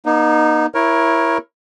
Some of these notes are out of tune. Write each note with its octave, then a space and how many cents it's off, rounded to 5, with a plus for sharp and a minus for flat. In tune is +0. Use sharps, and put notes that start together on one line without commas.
A#3 +45 D#4 -15
E4 +10 A#4 +20 C#5 -15